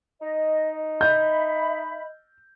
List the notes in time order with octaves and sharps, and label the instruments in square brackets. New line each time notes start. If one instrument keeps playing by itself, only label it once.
[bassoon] D#4 [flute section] D#5
[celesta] D#5 [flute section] E5 B5 [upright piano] G6